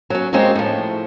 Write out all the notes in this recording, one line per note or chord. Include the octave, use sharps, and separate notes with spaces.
F#3 C#4
G#3 A#3 C4 C#4 D#4 F#4
A2 F3